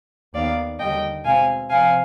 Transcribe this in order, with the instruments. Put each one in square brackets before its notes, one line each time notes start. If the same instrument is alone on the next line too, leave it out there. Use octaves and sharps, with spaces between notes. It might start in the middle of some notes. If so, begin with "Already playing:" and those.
[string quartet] D#2 D#3 B3 D5 F5
D#2 D3 G3 D#5 G5
B2 G#3 C4 F5 G#5
C3 F3 C4 F5 G#5